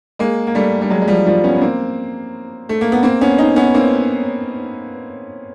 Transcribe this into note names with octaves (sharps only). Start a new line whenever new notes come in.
G#3 A#3
A#3
G3 A3
G3
F#3 G#3
G#3
F3 G3
F3 G3
B3 C#4
B3
A#3 C4
A3
A#3
B3
A#3 C4
B3 C#4
C#4 D#4
B3 C#4
A#3 C4